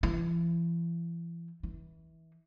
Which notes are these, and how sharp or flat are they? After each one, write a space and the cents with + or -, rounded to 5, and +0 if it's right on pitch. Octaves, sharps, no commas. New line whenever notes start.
E3 +40
E3 -25